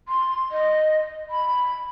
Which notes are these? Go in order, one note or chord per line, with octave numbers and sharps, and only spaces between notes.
C6
D#5
B5